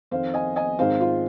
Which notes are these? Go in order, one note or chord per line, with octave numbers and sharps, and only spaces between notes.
F2 D#3 C4 C5 F5
D#5 G#5
D#5 G#5
G#2 D#3 C4 C5 F5
F4